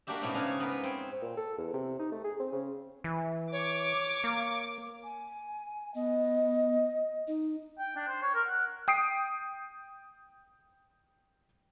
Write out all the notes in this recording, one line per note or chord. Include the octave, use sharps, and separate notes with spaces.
A#3 D4 F#4 G4 E5
G#2 B2 A3 C#4 E4 F#4
C#3 C#4 D4 G#4 F5 G#5
C#5
B3 A#4 B4
C4 C#5
A#2
A4
E2
C3
D#4
A3
G#4
C4
C#3
E3
C#5 D6
A#3
G#5
B3 D#5
D#4
G5
D4
C5
C#5
A#4
F#5
G5 D#6 C7 D7